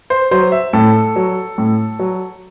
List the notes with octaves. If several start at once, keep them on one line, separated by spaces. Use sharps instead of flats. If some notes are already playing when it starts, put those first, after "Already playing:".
C5
F#3 C5
E5
A2 A4
F#3
A2
F#3